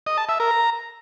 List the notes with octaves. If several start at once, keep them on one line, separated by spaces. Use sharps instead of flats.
D#5
A5
E5
A#4
A#5